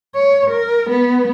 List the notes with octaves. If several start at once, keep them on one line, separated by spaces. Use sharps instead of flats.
C#5
A#4
B3